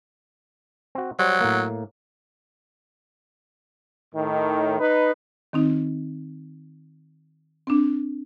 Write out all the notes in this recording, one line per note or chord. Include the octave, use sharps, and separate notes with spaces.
C4 F#4
F#3 G3 C5
A2 A#3
A2 D#3
D#4 B4
D#3 C4 D#4
C4 D4